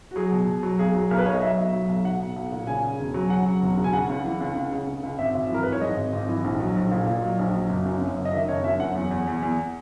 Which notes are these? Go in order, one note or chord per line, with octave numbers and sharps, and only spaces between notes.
F#4
F#3 G#4
B2
B2
F#3
B1 G#4
F#3
B1 A#4
B4
B1 C#5
D#5
F#3 E5
B1
F#3
B1
B1 F#5
B1
B1
A#2
C#3 G#5
C#3
E1
F#3
C#3 F#5
F#3
E1
C#3
G#5
C#3 F#5
C#2
E3
C#2
C#2
C#3
C#2
C#2
G#1 E5
G#1
E3 A#4
G#2 B4
C#5
G#2 D#5
G#1
G#1
E3
A#1
F#3
A#1
A#2
A#2
F#3
A#1
F#3
F#1
F#2
F#2
F#1
D#5
D#3 E5
F#1 C#5
F#2 E5
F#2 F#5
E2
E2
E2
E2